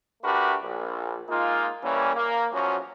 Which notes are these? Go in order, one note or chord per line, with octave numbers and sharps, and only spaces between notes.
A3 D4 F#4 G4 A#4 B4
A#1
G#3 A#3 D#4 F4
C#3 E3 G3 A#3 C#4
A#3
E2 F3 F#3 C#4 F#4